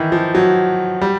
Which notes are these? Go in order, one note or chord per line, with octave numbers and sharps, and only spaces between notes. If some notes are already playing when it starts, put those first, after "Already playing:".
Already playing: D#3 E3
F3
F#3
G3